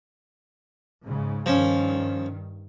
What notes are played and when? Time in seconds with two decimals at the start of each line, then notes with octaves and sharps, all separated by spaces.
1.04 G#2 C#3
1.46 G2 D#3 F3 C#4